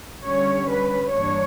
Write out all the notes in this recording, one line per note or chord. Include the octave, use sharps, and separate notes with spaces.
D3 G3 C#4 C#5
B4
G2 E3 A#3 D4 C#5